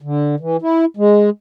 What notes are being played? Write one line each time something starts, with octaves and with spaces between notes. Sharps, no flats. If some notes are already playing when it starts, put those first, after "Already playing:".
D3
E3
E4
G#3